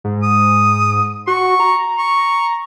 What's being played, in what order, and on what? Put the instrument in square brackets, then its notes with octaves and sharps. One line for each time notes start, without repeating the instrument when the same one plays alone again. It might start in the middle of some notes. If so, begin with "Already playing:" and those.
[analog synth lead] G#2
[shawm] D#6
[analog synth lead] F#4 [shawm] C#6
[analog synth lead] A#5
[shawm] C#6